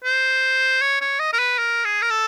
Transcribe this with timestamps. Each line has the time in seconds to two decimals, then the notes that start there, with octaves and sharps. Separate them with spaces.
0.04 C5
0.82 C#5
1.01 C#5
1.20 D#5
1.33 A#4
1.39 B4
1.58 A#4
1.85 G#4
2.02 A#4
2.10 A4